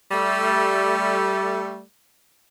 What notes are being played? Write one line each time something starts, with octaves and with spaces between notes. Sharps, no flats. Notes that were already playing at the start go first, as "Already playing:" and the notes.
G3 A3